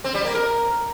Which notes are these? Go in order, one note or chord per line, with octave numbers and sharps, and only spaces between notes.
C4
G3
A#3
A#4